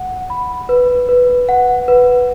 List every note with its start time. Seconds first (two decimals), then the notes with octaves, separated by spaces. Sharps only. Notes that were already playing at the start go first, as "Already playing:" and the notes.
Already playing: F#5
0.30 B5
0.69 B4
1.09 B4
1.49 F#5
1.88 B4